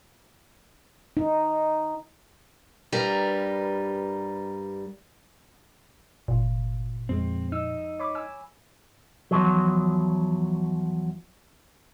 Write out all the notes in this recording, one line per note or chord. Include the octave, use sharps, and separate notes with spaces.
D#4
G2 G3 A#4 B4 A#5
G1 C2 A#2 F4
F2 F3 G#3 C4
D#4 E6
C#5 B5 D6
G#5 E6
E2 F3 F#3